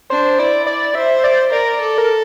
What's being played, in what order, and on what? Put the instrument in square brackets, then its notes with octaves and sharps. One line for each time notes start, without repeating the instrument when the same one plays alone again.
[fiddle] D4 [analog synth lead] C5
[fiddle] E4 [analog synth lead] D5
[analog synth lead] D5
[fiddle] C5 [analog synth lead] E5
[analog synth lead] D5
[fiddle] A#4 [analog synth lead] D5
[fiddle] A4
[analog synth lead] A#4